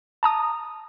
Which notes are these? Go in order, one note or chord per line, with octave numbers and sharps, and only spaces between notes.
A5 A#5 D#6